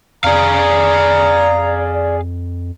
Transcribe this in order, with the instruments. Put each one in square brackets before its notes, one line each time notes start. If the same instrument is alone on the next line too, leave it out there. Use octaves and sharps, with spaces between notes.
[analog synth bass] F2 [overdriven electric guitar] G#4 F5 [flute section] D5 [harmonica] A#5